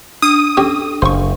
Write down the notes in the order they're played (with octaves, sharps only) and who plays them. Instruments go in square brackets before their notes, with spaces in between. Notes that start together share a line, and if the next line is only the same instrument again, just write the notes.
[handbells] D4 [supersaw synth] D#6
[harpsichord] C#4 G4 [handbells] D4 A4
[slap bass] F#1 [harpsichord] C5 C#6